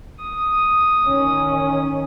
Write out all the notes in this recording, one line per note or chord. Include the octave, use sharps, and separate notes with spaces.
D#6
D#3 C#4